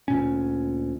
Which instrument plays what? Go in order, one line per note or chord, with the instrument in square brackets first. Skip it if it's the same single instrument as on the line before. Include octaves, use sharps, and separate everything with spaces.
[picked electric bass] D2 A#2 C#4